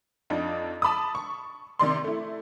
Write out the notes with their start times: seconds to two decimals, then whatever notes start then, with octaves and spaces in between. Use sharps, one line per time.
0.30 F2 D4 D#4
0.82 A5 B5 D6 D#6
1.15 C#6
1.79 C3 D#3 D5 C6
2.04 A3 E4